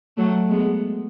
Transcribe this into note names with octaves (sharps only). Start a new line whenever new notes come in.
F#3 A3
G#3 B3